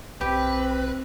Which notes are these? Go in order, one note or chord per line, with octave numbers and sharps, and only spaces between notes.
B1 C4 G4 B4